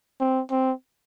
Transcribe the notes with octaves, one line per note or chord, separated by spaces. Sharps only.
C4
C4